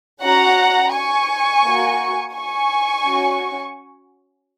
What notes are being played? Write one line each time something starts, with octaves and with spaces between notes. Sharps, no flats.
C#4 F#4 F#5 A#5
G#5 C#6
A#3 F#4
G#5 C#6
C#4 F#4